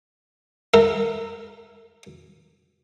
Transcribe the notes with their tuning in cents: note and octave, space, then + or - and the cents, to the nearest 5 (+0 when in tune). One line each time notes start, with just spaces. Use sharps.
A#4 -25 E5 +0